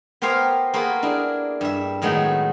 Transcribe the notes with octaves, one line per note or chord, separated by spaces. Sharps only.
B3 G4 A#4 C5 F5 G#5
A#3 F4 F#4 G#4 A4 B4
D4 E4 G#4 A#4
G2 E5
A2 D#3 F#3 G#3 A3 B3